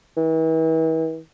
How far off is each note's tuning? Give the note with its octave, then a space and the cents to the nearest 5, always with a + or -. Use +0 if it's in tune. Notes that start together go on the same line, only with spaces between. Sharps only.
E3 -40